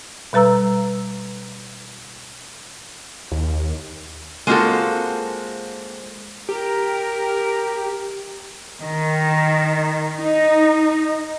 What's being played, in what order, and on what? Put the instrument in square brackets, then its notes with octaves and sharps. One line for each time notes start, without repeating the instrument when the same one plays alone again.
[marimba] B2 G3 B4 A#5 E6
[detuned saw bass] D#2
[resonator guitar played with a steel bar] G#3 A#3 C4 F4 F#4 A4
[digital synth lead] G4 [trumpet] A#4
[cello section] D#3
D#4